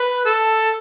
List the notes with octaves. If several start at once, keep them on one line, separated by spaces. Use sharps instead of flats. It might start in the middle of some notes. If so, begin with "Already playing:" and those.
Already playing: B4
A4